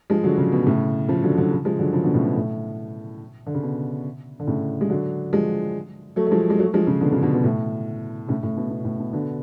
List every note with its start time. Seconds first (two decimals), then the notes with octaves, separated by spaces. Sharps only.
0.10 F3 G#3
0.23 D3 F#3
0.38 C#3 F3
0.52 B2
0.66 A2 C#3
1.08 C#3 F3
1.23 D3 F#3
1.37 D3 F#3
1.51 C#3 F3
1.65 F3 G#3
1.79 D3 F#3
1.93 C#3 F3
2.04 B2 D3
2.14 A2 C#3
2.25 B2
2.36 A2
3.46 D3
3.54 C#3
3.63 B2
4.40 D3
4.47 A2 C#3
4.81 G#3
4.90 D3 F#3
5.33 F3 G#3
6.16 F#3 A3
6.27 A3
6.31 F3 G#3
6.50 G#3
6.59 F#3 A3
6.74 F3 G#3
6.87 C#3 F3
7.01 B2 D3
7.12 C#3 F3
7.23 B2 D3
7.34 B2
7.44 A2
8.28 A2 C#3
8.43 A2
8.57 B2
8.71 B2
8.84 A2
9.00 B2
9.13 B2 D3